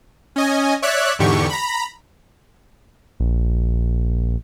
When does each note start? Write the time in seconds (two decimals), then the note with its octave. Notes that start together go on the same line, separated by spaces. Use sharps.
0.36 C#4 D#5 G#5
0.82 C#5 D5 E5 F#6
1.19 E2 G#2 D3 G4 C#6
1.49 A#5 B5
3.20 A#1